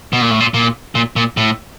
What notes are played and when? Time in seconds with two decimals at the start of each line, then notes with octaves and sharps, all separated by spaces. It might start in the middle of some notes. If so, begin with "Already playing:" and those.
0.13 B2
0.21 A#2
0.31 A2
0.40 A#2
0.54 A#2
0.95 A#2
1.16 A#2
1.37 A2